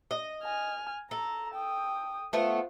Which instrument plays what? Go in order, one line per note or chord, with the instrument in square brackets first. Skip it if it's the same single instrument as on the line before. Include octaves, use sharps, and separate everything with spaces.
[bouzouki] D#5
[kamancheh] G#5 F6
[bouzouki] A4 [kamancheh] A#5
[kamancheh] G5 D#6
[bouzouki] A3 B3 [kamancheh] F4 C5